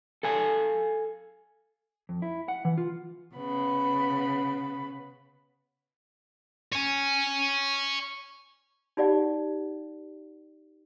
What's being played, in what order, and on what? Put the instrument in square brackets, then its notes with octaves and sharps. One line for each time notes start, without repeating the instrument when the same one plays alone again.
[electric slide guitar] A4 F5 G#5
[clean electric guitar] F2
E4
F#5
E3
F4
[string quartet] C#3 B3 B5
[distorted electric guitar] C#5 G#5
[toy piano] D#4 G4 D5 F#5